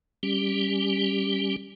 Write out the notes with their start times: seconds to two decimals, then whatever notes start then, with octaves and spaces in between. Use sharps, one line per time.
0.23 G3 C#4 G4